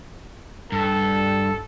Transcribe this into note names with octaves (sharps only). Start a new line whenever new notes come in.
G2 A4